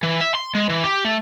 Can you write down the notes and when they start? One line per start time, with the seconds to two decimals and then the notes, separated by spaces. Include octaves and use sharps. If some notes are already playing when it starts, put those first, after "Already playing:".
0.03 E3
0.21 E5
0.35 C6
0.55 G#3
0.70 E3
0.84 G4
1.05 A3